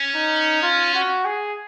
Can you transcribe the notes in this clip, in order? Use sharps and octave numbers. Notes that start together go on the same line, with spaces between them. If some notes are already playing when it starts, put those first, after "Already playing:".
Already playing: C#4
D#4
F4
F#4
G#4